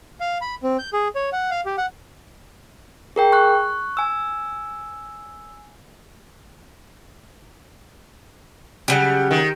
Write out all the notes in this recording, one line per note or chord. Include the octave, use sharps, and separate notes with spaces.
F5
B5
C4
G6
G#4
C#5
F#5
F5
G4
F#5
G#4 A#4 G5
C#6 F#6
G#5 E6
C#3 F#3 G3
D#3